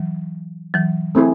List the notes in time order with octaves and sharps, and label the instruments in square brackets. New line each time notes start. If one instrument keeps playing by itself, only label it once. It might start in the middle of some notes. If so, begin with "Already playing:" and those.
Already playing: [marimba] E3 F#3
E3 F#3
[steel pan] A3 C4 E4 G#4